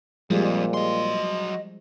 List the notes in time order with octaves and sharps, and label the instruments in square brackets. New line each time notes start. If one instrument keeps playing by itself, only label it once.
[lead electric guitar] F2 [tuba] A#2 [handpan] F3 G3 G#3
[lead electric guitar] F#3 C6 [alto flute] D#5